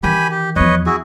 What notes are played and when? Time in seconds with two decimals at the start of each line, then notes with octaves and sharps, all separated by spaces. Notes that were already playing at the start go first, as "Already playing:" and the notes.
0.03 D#3 E3 G4 G#5 B5
0.31 G4
0.56 E2 F3 B4 C#5 D#5
0.86 E4 F#4 G#4